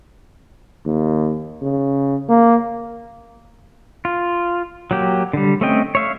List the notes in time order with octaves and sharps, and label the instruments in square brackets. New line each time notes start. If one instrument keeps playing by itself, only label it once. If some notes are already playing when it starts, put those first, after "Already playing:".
[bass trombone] D#2
C#3
A#3
[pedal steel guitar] F4
F#3 A#3 G4
D3 G3
A3 C4 C#4 D#5 G5
C#5 E5 F5